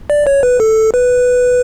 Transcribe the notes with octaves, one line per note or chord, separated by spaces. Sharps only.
D5
C#5
B4
A4
B4